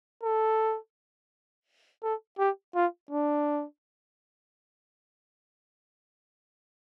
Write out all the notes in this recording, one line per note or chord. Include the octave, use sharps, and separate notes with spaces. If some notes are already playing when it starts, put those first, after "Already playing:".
A4
A4
G4
F4
D4